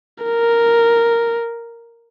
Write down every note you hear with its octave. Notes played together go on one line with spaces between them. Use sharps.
A#4